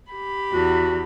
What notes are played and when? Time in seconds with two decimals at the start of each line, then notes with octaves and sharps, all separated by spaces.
0.12 G4 B5
0.53 E2 F#4